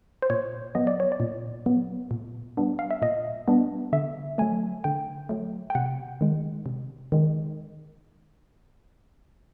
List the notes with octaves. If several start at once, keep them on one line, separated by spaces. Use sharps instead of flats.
C5
A#2 C#5
F#3 B3 D#5
D5
C#5
D5
A#2
F#3 B3
A#2
G3 B3 D4
F5
E5
A#2 D#5
G3 B3 D4
D3 E5
F#3 A3 G#5
D3 G5
F#3 A3
G5
C3 F#5
D#3 G#3
C3
D#3 G#3